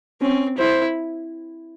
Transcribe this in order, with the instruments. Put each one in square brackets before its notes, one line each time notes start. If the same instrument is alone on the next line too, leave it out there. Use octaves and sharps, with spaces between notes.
[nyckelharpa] C4 [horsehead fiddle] C#4
[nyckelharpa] E4 [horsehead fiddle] C5